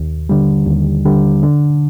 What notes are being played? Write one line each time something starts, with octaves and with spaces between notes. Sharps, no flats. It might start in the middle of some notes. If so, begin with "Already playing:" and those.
Already playing: D#2
D3 G3
D#2
D3 G3
D3